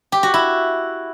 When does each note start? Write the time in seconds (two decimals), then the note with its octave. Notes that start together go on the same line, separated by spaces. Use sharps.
0.12 G4
0.23 F#4
0.34 E4